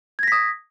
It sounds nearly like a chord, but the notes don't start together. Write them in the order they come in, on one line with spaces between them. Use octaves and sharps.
G#6 A#6 B6 D#6